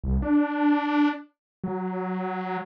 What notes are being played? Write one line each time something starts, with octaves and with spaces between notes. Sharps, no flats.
C2
D4
F#3